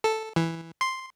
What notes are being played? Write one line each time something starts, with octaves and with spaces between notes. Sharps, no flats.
A4
E3
C6